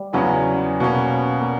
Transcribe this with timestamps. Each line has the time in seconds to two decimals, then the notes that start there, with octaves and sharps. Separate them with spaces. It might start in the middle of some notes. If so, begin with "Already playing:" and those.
Already playing: G3
0.13 E2 C#3 F#3 B3 C#4
0.80 B2 A#3 C#4
1.41 A#3